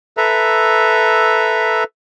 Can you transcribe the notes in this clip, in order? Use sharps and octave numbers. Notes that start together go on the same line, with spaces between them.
A4 B4 E5 A#5